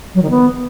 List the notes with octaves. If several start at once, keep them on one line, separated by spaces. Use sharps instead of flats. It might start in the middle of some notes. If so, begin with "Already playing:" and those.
F#3
D#3
B3